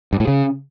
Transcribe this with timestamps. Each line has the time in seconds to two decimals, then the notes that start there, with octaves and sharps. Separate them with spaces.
0.13 G2
0.20 A2
0.28 C#3